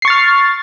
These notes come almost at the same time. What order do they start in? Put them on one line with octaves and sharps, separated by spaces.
C7 C#6 A6 F6